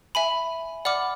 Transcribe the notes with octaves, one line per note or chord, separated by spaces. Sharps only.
E5 G#5 B5
D5 F#5 B5 D6 F6